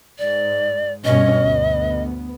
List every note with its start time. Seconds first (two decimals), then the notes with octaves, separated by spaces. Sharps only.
0.19 G#2 D5
1.05 G2 B2 C#4 D#5
1.41 D2 B3